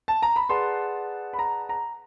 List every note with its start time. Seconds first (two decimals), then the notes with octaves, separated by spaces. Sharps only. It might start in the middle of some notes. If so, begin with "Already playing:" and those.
0.08 A5
0.22 A#5
0.36 B5
0.49 G#4 B4 D5 F#5 A5 C6
1.33 B5
1.39 A#5
1.69 A#5